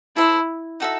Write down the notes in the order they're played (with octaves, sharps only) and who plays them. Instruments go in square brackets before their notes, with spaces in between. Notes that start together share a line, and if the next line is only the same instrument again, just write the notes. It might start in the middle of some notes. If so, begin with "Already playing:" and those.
[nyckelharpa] E4 [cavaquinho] A4 C5 E5 B5
[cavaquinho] D#4 F#4 A4 E5